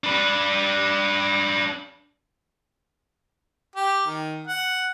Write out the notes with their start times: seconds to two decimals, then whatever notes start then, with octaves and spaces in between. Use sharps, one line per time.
0.04 D4 B4
3.76 G4
4.06 D#3
4.47 F#5